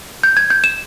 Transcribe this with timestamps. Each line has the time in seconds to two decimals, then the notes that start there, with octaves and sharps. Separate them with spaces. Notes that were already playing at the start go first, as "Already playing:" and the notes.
0.23 G6
0.37 G#6
0.50 G6
0.64 E7